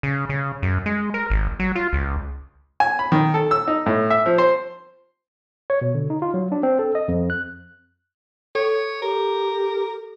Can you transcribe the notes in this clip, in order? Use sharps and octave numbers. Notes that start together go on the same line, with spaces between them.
C#3
C#3
F#2
G#3
A#4
G#1
F#3
F4
C#2
G#5
B5
D#3
A4
E6
D#4
A2
E5
F3
C5
C#5
B2
D3
D#4
F4
F#3
D4
C4
A4
D#5
F2
F#6
A4 C#5
G4 A#4